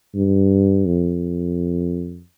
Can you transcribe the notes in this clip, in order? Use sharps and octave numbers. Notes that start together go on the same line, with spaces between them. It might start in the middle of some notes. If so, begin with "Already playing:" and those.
G2
F2